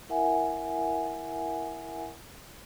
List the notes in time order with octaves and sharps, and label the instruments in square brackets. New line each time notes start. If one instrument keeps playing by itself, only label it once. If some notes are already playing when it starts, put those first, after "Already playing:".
[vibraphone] E4 A#4 E5 F#5 G#5